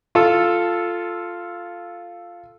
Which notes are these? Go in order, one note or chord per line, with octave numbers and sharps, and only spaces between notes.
F4 A4